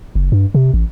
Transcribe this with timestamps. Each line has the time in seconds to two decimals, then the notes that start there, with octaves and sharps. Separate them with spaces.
0.15 F#1
0.32 G2
0.54 C3
0.74 A1